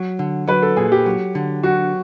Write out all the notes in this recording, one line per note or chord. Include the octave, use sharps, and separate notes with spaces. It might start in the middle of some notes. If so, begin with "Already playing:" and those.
Already playing: F#3
D3
F#3 B4
A4
A#2 G#4
G4
F#3
D3
F#3 F#4